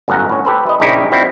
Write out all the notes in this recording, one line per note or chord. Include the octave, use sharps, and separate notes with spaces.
G1 F#2 A2 F5 F#5 A#5
A2 C#4
G4 A4 B4 C5
E4 D#5
A#1 C#3 D#4 E4 G4
F3 G3 C4 E4 F#4